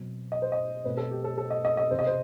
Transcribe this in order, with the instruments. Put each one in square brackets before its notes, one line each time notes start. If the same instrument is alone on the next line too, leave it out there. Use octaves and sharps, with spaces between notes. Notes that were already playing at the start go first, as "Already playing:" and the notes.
Already playing: [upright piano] B2 F#3 C4
D#5
C5
D#5
B2 A3 C4 B4
A4
G4
A4
A4
D#5
D#5
D#5
E2 C3 E3 C5
D#5
C5